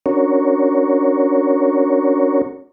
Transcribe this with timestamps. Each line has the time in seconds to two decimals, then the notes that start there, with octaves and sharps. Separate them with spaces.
0.06 C#4 D4 F#4 A#4 C#5